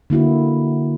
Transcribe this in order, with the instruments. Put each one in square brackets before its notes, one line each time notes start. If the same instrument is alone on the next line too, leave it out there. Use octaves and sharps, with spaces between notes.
[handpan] D3 A#3 E4 F#4